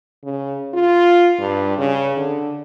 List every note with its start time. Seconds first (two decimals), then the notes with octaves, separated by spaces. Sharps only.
0.24 C#3
0.74 F4
1.39 G2
1.78 C#3
2.17 D3